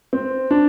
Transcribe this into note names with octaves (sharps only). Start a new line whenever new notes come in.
C4
D4